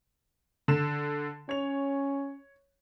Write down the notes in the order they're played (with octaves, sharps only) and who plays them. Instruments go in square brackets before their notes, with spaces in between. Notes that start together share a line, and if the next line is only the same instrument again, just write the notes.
[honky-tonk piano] D3 E7
[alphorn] C#4 [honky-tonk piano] C#5 F7